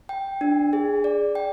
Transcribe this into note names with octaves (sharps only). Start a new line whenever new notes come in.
G5
D4
G#4
D5
G5